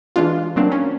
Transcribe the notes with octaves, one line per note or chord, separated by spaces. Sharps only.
E3 G#3 D4 F4
F#3 A#3 C4 D4
C#4